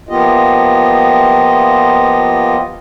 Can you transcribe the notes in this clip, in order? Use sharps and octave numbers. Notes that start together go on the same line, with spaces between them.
F3 A#3 B3 F4 G4 D#5